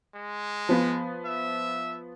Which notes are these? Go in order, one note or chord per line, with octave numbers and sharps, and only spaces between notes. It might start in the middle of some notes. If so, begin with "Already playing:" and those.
G#3
F3 B3
E5